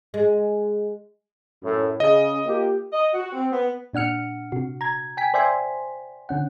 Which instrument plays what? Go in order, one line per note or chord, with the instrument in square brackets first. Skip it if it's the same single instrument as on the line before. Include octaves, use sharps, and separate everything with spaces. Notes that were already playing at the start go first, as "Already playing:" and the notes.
[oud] G#3
[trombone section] F#2 A2
[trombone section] C#3 [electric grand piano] D#5
[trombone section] A#3 F4 G4
[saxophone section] D#5
F#4
C4
B3
[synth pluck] A#2 D4 F#5 F6 C#7
C3 F#4
A#5 G#6
G5 G#5 B6
C5 D5 E5 G5 G#5 C6
D3 C#4 F#5